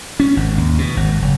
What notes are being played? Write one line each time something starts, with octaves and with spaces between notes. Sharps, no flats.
C#4
G#1
D#2
B2
G#1
F#1